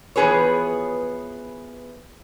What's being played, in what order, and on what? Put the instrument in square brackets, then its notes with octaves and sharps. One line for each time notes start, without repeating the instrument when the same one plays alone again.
[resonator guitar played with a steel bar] E3 F3 B3 G#4 B4 C#5